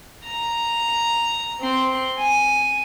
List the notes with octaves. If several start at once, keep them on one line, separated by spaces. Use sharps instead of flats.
A#5
C4 C6
G#5